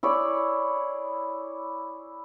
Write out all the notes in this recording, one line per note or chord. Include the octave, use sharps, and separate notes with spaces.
E4 G#4 C#5 D5